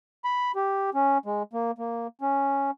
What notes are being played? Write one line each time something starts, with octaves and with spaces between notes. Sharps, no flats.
B5
G4
C#4
G#3
A#3
A#3
C#4